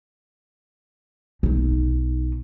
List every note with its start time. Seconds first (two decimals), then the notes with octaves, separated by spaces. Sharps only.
1.43 B1 D#4